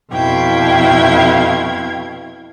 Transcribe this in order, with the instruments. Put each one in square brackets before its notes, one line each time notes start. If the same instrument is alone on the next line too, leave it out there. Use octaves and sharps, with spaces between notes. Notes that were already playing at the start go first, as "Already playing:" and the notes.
[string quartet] F2 B2 E4 F5 G5 G#6